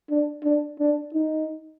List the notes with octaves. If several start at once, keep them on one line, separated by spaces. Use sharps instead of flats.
D4
D4
D4
D#4